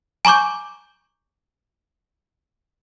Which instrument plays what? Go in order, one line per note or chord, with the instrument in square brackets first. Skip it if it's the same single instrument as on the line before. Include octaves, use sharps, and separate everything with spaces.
[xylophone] G#5 A#5 C#6 D6 G6